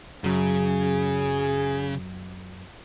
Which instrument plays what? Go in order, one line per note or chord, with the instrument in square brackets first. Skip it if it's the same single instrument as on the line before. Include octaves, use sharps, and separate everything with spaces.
[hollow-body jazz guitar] F#2 F#3 [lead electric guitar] C#3 [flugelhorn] G#4